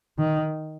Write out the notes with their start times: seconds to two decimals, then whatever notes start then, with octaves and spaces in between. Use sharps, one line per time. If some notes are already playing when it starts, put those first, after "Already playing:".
0.18 D#3